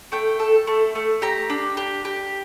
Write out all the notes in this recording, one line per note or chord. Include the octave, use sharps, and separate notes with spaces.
A3 G5
A4
A3
A3
G4 A#5
D4
G4
G4